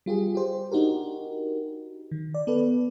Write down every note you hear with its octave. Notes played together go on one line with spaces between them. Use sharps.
G3 F4 G4 G#4
G4 C5
D4 D#4 F#4 G4 A#4
D#3
D5
B3 A4 B4 D5